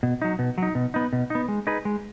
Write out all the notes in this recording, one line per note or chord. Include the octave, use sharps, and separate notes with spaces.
B2
F#3 D#4
B2
F#3 D#4
B2
B3 D#4
B2
B3 D#4
G#3
D#4 G#4 B4
G#3